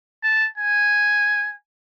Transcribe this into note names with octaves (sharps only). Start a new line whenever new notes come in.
A5
G#5